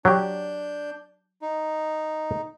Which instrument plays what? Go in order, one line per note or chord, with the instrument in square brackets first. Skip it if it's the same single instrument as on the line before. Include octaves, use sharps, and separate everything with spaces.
[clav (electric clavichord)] F#3 G4 [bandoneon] D4 G6
[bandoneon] D#4